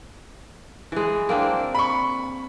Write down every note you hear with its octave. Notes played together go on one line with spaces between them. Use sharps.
E3 G#3
A#3 C4 D4
B5 C#6